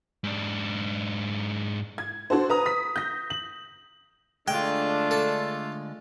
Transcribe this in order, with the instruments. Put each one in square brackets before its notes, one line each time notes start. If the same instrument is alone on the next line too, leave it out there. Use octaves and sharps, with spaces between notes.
[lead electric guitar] G#2 D4
[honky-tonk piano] G#6
D4 F#4 A4 C5
B4 A#5 D#6
D#6 B6
G6 A#6
F#7
[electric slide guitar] D3 G#3 [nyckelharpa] A3 F4 [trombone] D4 [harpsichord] G5
[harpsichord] A4